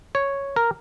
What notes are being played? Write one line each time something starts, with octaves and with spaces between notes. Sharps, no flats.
C#5
A#4